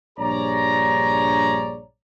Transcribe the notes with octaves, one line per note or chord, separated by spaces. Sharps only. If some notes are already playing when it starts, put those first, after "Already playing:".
A#1 G2 G#4 C#5 D5 A#5